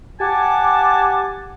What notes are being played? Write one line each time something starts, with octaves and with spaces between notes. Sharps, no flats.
G4 F#5 G#5 A5 D6